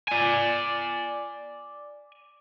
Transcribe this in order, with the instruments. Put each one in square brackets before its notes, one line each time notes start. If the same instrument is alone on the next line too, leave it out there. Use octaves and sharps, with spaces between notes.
[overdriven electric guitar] D5 G#5